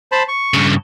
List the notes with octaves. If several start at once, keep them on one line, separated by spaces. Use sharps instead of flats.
C5 A5 B5
C#6
G2 C#3